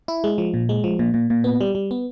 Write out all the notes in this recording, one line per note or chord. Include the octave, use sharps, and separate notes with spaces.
E4
G#3
F3
A#2
G#3
F3
A#2
A#2
A#2
B3
G3
G3
B3